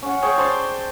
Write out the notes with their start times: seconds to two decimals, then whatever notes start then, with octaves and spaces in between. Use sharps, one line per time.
0.02 C#4 F#5
0.22 G#4 C#5 G5 C#6
0.38 C5 D5 A5 C6